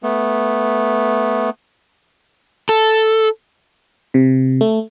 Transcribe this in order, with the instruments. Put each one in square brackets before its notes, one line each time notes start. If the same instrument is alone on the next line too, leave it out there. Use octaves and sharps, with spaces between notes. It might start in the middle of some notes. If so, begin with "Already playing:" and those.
[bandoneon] A3 B3
[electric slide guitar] A4
[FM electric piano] C3
A3